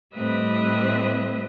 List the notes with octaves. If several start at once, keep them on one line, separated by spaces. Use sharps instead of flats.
A2 G3 C4 B4 D#5 E5